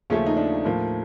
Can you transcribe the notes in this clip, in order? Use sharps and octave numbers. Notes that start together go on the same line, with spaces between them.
D#2 C#3 F3 A3 C#4
D#4
D4
A2 F3 A#3